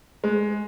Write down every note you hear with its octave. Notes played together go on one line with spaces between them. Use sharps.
G#3